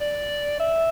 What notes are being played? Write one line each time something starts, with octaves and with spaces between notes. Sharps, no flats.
D5
E5